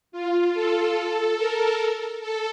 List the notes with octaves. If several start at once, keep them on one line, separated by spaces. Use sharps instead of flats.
F4
A4
A#4
A4